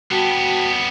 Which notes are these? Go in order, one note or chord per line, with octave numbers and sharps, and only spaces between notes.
G3 B3 F#4 G5 A5